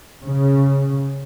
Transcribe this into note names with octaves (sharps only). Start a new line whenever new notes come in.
C#3